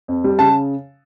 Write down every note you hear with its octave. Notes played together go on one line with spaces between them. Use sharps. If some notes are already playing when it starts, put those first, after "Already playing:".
F2
G3
C#3 A5